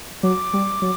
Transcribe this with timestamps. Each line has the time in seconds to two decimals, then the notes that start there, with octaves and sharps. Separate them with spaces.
0.23 F#3 D6
0.54 G3
0.82 F#3